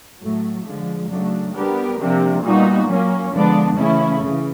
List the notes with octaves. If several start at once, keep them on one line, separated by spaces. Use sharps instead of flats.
A2 F#3 A3
D3 F3 G#3
C#3 F#3 A3 D4
G3 B3 D4 G4 A#4
C3 F3 A#3 D4
A#2 G3 B3 D#4 F#4
F#3 A#3 C#4
D3 F3 G#3 B3 D4
C#3 E3 A3 C#4 E4
C#3 E3